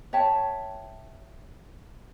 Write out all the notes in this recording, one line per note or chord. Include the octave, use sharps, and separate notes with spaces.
C#5 E5 G5 A5